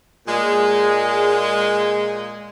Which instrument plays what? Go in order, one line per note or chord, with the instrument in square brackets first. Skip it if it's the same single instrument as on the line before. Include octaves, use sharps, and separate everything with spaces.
[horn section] A#2 G#3